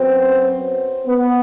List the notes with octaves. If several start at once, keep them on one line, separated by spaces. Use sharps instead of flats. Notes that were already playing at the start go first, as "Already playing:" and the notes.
Already playing: F#2 F#3 B3 C4
B3